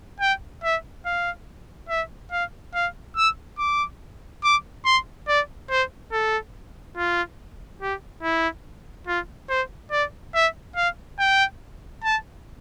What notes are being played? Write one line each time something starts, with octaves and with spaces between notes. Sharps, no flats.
G5
E5
F5
E5
F5
F5
E6
D6
D6
C6
D5
C5
A4
F4
G4
E4
F4
C5
D5
E5
F5
G5
A5